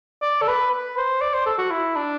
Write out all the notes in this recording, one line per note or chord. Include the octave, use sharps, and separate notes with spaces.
D5
A4
B4
B4
C5
D5
C5
A4
F#4
E4
D4